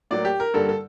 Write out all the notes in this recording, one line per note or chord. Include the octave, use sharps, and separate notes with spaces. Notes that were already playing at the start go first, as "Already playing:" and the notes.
A2 F#3 A#3 D5
G4
A#4
G2 D3 G3 A#3 A4
A4